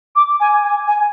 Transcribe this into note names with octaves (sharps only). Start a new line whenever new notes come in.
D6
G#5
G#5
G#5